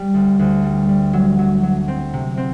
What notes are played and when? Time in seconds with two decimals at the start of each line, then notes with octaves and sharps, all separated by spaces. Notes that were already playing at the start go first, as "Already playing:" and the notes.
Already playing: G3
0.14 D2
0.39 D2
0.64 G3
0.88 G3
1.13 F#3
1.39 F#3
1.63 F#3
1.88 C4
2.13 C3
2.37 C4